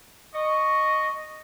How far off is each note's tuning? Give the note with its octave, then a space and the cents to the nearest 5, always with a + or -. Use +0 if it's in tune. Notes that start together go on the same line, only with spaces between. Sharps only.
D#5 -10 C#6 +0